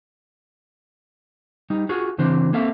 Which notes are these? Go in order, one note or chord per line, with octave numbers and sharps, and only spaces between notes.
G3 D#4
F4 F#4 G#4
C#3 E3 C4 D4 C5
A#3 C4 A4 E5 F5